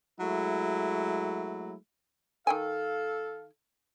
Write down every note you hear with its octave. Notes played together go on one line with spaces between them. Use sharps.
F#3 G#3 A3 E4
D#3 A4 F5 G5 G#5